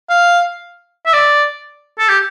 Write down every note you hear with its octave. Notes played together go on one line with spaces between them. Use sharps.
F5
E5
D5
A4
G4